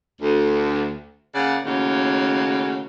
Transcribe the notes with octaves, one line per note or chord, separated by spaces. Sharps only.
D2
C#3 A#3 D5 F#5
D#2 A2 C#3 F#3 C#4